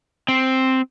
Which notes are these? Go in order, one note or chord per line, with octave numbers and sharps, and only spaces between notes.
C4